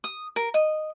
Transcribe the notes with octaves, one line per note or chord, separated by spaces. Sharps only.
D#6
A#4
D#5